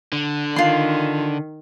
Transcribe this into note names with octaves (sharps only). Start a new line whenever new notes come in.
D3
D#3 F4 C6